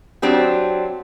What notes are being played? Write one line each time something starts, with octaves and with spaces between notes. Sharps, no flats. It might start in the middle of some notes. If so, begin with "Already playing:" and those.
F#3 C4 D4 G4